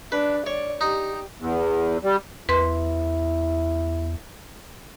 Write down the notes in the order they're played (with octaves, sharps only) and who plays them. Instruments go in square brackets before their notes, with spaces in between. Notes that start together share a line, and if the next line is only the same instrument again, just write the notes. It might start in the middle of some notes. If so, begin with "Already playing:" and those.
[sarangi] D4 [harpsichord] B4
[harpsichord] C#5 [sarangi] D5
[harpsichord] D#4 [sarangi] G4
[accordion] E2
G3
[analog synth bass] E2 [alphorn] E4 [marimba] B4 C6